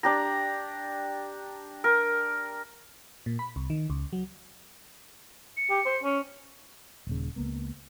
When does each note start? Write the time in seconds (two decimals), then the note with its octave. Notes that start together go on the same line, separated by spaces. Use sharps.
0.03 D4 G4 A#5
1.84 A#4
3.26 A#2
3.39 B5
3.56 C2
3.70 D#3
3.90 C#2
4.13 F#3
5.57 C#7
5.70 G4
5.86 C5
6.03 C#4
7.07 D#1 D#2 C#3
7.36 C#2 A#3 B3